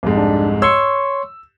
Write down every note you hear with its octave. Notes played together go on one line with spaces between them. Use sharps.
C2 F2 G#2
D4
C#5 C6 C#6 E6